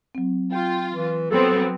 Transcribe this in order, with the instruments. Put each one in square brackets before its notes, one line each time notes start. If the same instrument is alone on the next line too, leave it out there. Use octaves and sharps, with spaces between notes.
[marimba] F#3 C4
[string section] F4 [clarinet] G5
[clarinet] E3
[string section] F#3 B3 C4 [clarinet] A4